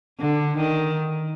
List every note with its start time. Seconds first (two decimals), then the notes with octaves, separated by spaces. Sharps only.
0.19 D3
0.57 D#3